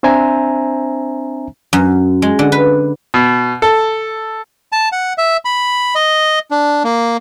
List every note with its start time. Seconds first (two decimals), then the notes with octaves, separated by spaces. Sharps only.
0.03 C4 D4 C5 E5 G#5 A#5
1.73 F#2
2.22 G#3
2.39 D3
2.52 B4
3.14 B2
3.62 A4
4.72 A5
4.92 F#5
5.18 E5
5.45 B5
5.95 D#5
6.51 D4
6.84 A#3